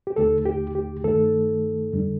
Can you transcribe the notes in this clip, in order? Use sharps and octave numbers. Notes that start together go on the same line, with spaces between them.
G4
D#2 D3 A3 D#4 A4
G4
G4
G2 D#3 A3 D#4 A4
F2 D3 G3 D4